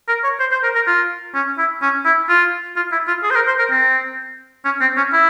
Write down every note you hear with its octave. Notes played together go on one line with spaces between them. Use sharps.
A#4
C#5
C5
C5
A#4
A#4
F4
C#4
E4
C#4
E4
F4
F4
E4
F4
G#4
C5
A#4
C5
A#4
C4
C#4
C4
C#4
E4